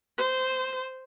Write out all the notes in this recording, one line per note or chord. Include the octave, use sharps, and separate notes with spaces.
C5